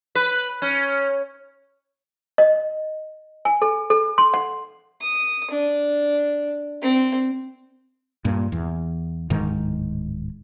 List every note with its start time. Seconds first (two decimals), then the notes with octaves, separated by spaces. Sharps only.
0.15 B4
0.62 C#4
2.38 D#5
3.45 G#5
3.62 A4
3.90 A4
4.18 C6
4.34 F#5
5.02 D#6
5.50 D4
6.82 C4
8.25 G2 A#2
8.52 E2
9.30 D1 G#2 D#3